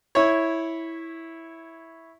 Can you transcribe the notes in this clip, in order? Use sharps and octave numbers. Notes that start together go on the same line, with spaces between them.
E4 C#5